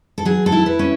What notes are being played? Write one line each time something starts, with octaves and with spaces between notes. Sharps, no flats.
A4
F#3 G#4
A4
E4
B4
C#4